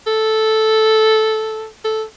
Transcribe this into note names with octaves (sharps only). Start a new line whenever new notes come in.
A4
A4